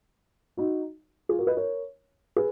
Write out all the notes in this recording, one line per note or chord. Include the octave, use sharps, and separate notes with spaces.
D#4 F#4
F4 G#4
F#4 A#4
B4 D#5
A#4 C#5
G#4 B4